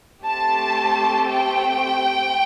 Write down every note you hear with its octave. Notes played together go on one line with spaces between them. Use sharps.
A3 C4 G4 A5
G5